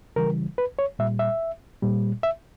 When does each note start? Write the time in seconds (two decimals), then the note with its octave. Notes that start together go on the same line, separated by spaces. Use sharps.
0.16 C#3 E3 G3 A#4
0.58 B4
0.79 C#5
0.99 A#2 G3 E5
1.19 E5
1.82 A#2 G3
2.23 E5